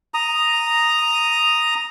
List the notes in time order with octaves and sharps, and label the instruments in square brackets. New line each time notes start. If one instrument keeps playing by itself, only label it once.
[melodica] A#5 D#6